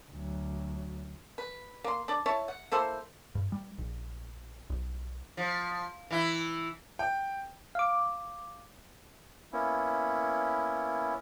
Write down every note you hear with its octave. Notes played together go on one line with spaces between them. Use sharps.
D2 F#3
B4
A#3 C6
D4 D5
E4 C#5 A5
F#5
A#3 E4 A4 C5
G2
G3
A#1
B1
F3
E3 E4
G5
F5 D6
A#3 B3 C#4 E4